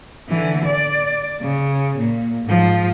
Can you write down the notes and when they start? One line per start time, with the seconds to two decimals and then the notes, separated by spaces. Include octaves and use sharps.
0.29 D3 E3
0.65 D5
1.41 C#3
1.98 A#2
2.44 G#2 F3